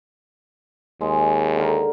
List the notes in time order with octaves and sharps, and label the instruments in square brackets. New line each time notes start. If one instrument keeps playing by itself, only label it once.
[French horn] D#2 [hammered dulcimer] G#3
[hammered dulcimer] D3 A#4